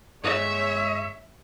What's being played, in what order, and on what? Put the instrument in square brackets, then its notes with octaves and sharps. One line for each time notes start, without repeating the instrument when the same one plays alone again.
[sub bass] G2 [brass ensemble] G#3 C#5 [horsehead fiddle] E5